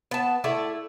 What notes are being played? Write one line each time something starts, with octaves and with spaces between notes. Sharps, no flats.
B3 A5
A3 E4 D5